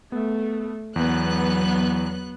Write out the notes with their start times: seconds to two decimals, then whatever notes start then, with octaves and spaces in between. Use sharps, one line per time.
0.12 A3 B3
0.96 E2 F#3 B3 F#6